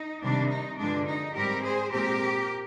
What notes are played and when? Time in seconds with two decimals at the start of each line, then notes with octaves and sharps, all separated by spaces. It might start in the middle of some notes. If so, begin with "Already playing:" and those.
Already playing: D#4
0.22 C3 D#3 G3 D4
0.50 D#4
0.78 G2 D3 F3 G#3 D4
1.07 D#4
1.35 G#2 G3 C4 G4 A#4
1.64 G#4 C5
1.92 A#2 G#3 C4 G4 A#4